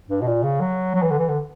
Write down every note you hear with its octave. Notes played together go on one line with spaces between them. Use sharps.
G2
B2
A#2
C#3
F#3
F#3
E3
D3
E3
D3